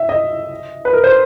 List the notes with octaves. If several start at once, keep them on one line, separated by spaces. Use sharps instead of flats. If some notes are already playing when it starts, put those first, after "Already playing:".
Already playing: E5
D#5
B4
A#4
C5